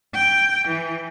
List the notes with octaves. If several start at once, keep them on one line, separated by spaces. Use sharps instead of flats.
G5
E3